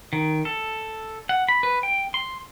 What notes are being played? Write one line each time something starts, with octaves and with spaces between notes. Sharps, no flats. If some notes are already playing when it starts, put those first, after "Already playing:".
D#3
A4
F#5
B5
B4
G5
C6